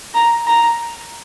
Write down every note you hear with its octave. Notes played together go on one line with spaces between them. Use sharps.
A#5
A#5